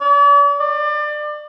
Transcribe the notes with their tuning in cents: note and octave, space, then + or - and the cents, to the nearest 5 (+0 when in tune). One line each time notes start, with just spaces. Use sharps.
D5 -45
D5 +30